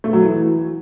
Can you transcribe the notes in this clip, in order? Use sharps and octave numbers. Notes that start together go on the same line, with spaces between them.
A3
F#3
E3